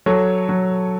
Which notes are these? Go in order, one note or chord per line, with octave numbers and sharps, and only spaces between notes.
F#3 A4 C#5
F#3